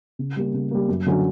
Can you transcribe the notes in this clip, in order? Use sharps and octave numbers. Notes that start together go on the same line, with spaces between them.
C#3
G3 A#3
C#3
G3 A#3
F#2
D3 F#3 C#4